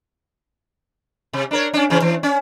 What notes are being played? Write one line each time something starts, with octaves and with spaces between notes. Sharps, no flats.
C3
D4 A#4 C#5
C#4 D4
C#3 E3 C#4
E3
C#4